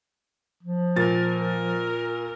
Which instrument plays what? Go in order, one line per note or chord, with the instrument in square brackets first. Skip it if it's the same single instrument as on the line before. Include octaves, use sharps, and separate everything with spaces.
[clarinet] F3
[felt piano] A#2 A6 [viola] A#4
[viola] A#4